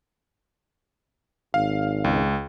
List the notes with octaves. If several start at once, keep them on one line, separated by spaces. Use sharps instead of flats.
G#1 F5
C#2